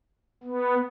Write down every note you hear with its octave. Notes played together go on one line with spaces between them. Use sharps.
B3